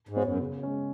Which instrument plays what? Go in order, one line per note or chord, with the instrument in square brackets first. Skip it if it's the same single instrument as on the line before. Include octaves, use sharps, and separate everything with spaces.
[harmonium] G#2
[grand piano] B3 F#4 C#5
[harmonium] F#2
[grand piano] C#3
G#3 C#4